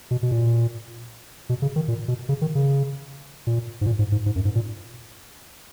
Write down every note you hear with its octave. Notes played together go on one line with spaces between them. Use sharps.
B2
B2
A#2
B2
C#3
D#3
A#2
B2
C#3
D#3
C#3
A#2
G#2
A#2
G#2
G#2
G#2
F#2
G#2
A#2